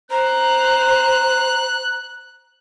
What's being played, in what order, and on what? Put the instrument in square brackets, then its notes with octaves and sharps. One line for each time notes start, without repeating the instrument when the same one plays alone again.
[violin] C5 [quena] A#5 [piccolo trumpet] F#6